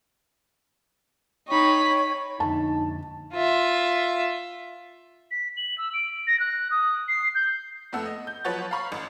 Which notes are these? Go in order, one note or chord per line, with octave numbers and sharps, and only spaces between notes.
D#4 C#5 G5 B5 C#6
F2 D3 D#4 A5
F4 E5
B6
F#7
E6
D7
A#6
F#6
D#6
C7
G6
F2 A3 B3 F#5 E6
D#5
G6
F3 F#3 B4 C#5 F#5 A6
F5 A#5 B5 C#6
A1